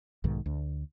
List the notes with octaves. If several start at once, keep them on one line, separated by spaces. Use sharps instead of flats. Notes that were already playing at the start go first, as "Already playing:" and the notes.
B1 G#2 D#3
D2